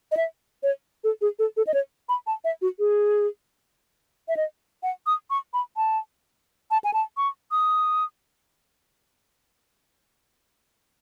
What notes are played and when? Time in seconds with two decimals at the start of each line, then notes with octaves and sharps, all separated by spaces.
0.12 D#5
0.17 E5
0.63 C#5
1.04 A4
1.21 G#4
1.39 A4
1.57 A4
1.67 D#5
1.74 C#5
2.09 B5
2.27 A5
2.44 E5
2.62 F#4
2.79 G#4
4.28 E5
4.37 D#5
4.83 F#5
5.06 D#6
5.30 C#6
5.54 B5
5.77 A5
6.71 A5
6.84 G#5
6.94 A5
7.17 C#6
7.51 D#6